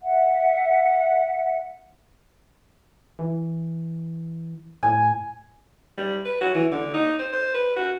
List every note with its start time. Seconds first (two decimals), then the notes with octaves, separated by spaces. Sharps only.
0.01 E5 F#5
3.19 E3
4.83 A2 G#5
5.97 G3
6.25 B4
6.41 F#4
6.55 E3
6.72 D3
6.94 D#4
7.19 C5
7.33 C5
7.54 B4
7.76 F#4